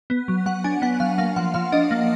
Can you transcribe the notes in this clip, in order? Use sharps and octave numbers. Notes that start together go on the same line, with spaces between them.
B3
F#3
F#3 F#5
D4 G#5
B3 F#5
F#3 F5
A#3 F5
F3 F#5
F3 F5
D4 D#5
A#3